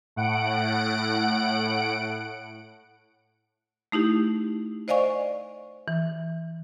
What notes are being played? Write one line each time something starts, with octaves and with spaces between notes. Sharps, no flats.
A2 F#5 D7
A3 D#4 E4 G4
C5 D5 D#5 F5 G#5 C#6
E3